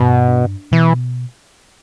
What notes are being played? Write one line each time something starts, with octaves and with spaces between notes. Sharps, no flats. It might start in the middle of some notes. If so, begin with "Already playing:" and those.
Already playing: G2 B2
D4
B2 E3